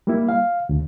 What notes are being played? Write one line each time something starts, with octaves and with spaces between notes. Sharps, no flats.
G3 A#3 E4
F5
D2